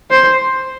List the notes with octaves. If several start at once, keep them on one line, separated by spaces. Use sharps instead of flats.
C5